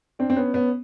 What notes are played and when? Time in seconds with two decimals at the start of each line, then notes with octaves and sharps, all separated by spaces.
0.19 C4 D4
0.30 C4
0.36 B3 C#4
0.54 B3 C#4